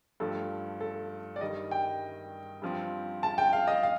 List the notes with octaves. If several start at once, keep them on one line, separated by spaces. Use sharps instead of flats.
G2 F3 A3 A4
A4
D5
G2 D#3 G3 D#5
G5
G2 F3 C4
A5
G5
F5
D#5
F5